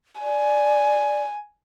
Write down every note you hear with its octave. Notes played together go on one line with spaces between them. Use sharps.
D5 G#5